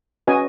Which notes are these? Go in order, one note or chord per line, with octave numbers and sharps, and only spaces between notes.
C#4 F#4 B4 D#5 G#5